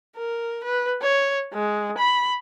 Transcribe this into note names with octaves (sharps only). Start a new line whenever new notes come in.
A#4
B4
C#5
G#3
B5